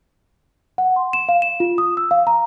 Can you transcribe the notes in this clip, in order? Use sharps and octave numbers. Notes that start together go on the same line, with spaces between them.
F#5
C6
E7
F5
E7
F4
D#6
E6
F5
A#5